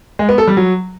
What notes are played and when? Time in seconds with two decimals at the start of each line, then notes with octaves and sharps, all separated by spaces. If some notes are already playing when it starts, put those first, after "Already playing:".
0.19 G#3
0.29 B3
0.38 A4
0.47 G3
0.57 F#3